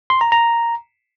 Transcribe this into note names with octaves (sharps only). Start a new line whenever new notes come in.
C6
A#5
A#5